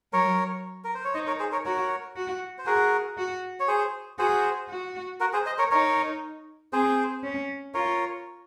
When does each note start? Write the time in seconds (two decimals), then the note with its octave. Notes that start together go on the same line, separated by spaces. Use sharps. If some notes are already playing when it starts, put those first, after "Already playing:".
0.13 F#3 A#4 C#5
0.84 A#4
0.95 C5
1.05 C#5
1.14 D#4 C5 D#5
1.27 A#4 C#5
1.39 G#4 C5
1.52 A#4 C#5
1.65 F#4 A#4 C#5
2.16 F#4
2.58 C5
2.66 F#4 G#4 A#4
3.17 F#4
3.60 C#5
3.68 G#4 C5
4.19 F#4 G#4 C5
4.69 F#4
5.20 F#4 A#4
5.33 G#4 C5
5.46 C5 D#5
5.59 A#4 C#5
5.71 D#4 A#4 C#5
6.73 C4 G#4 C5
7.23 C#4
7.74 F4 A#4 C#5